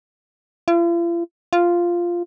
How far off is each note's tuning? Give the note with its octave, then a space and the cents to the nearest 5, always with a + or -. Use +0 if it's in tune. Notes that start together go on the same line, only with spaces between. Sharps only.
F4 -45
F4 -5